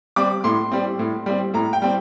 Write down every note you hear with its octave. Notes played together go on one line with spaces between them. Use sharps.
G3 C4 D6
A2 C6
G3 C4
A2
G3 C4
A2 A#5
G5
G3 C4